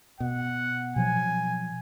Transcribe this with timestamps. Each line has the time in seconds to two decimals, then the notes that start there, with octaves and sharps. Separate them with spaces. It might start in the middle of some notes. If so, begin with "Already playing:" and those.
0.20 B2 F#5
0.96 B2 F3 F#3 G#5